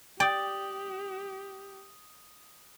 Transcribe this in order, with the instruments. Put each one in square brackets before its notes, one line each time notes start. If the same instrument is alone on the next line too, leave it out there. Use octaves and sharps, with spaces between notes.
[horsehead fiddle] G4 [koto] D5 [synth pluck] G5 [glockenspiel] D#6 F#7